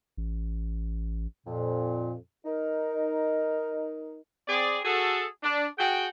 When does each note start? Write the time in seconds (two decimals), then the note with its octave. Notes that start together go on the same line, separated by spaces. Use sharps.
0.17 A1
1.47 F2 A#2
2.45 D#4 A#4
4.48 C4 G#4 D5
4.85 F#4 G#4 A4
5.43 D4
5.79 F#4 G#4 F#5 G5